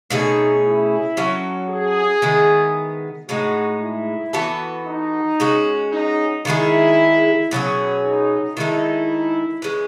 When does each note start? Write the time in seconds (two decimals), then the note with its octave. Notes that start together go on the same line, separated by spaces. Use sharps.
0.10 B2 A3 C#4 D#4 G#4
0.64 E4
1.17 F#3 C#4 F#4 A4
1.69 G#4
2.22 D#3 G#3 B3 E4
3.29 A2 G#3 D#4 F#4
3.81 E4
4.33 E3 B3 F#4 A4
4.86 D#4
5.40 G#3 C#4 F#4
5.92 D#4
6.45 D#3 G#3 D#4 E4 G#4
7.51 B2 F#3 C#4 G#4
8.05 D#4
8.56 D#3 G#3 D#4 E4 A4
9.62 E3 G#3 C#4